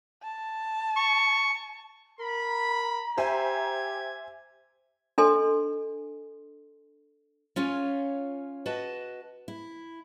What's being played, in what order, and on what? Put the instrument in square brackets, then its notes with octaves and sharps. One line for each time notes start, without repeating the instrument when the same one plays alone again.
[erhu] A5
[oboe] C#6
[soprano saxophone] A#4 [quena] A#5 [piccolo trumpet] B5
[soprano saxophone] G4 [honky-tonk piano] C5 E5 G#5 [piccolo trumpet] G#6
[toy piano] D4 A4 D#5 G#5 C6
[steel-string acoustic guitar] C#4 F4 C#5 G#5
F#4 B4 D#5 A5
E4